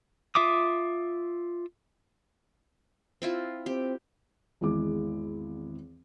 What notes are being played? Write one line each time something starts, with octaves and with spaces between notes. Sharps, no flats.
F4 E5 D6 D#6
C4 E4 F4
C4 G4
G#1 E2 G#3 E4 D6